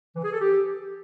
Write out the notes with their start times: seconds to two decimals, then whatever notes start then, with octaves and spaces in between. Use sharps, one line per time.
0.16 E3
0.24 G#4
0.33 A4
0.41 G4